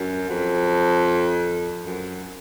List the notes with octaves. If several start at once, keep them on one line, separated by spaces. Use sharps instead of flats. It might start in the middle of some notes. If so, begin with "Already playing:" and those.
Already playing: F#2
F2
F#2